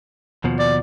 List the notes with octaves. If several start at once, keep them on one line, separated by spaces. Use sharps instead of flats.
D#2 B2 F3
D5